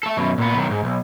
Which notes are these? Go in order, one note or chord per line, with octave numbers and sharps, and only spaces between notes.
A3 A4
F#2 B2
A#2 B3
B1 D#3
G#2
B1